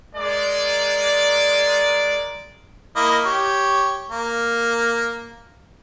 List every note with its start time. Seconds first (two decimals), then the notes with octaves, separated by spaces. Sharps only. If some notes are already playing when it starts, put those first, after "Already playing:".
0.15 G#3 A#4 D5
2.96 A#3 E4 D#5
3.25 G4 C#5
4.10 A#3